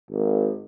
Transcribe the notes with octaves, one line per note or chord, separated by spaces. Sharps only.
G#1